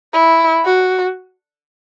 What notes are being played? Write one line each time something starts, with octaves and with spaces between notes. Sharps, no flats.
E4
F#4